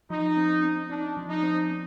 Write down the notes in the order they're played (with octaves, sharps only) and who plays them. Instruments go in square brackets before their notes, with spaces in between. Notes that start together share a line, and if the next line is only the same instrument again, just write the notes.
[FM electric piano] F3 [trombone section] D#4
[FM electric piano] C4
C4
[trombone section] D4 [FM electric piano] D#4
[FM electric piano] F3
[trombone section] D#4
[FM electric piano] C4
C4